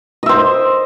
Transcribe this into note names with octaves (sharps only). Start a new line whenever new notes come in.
C5 D#5 E5